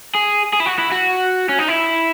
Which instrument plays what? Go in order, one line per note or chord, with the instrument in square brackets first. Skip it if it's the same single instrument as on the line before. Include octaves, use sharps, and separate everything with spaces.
[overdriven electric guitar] G#4
G#4
E4
F#4
E4
F#4
C#4
D#4
E4